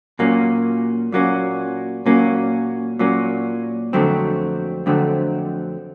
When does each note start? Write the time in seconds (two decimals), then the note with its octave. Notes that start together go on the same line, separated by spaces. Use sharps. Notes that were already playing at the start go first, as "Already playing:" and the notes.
0.19 A#2 F#3 A#3 C#4
1.12 A#2 F#3 A#3 C#4
2.06 A#2 F#3 A#3 C#4
2.99 A#2 F#3 A#3 C#4
3.93 F2 D3 F#3 A3 C4
4.86 F2 D3 F#3 A3 C4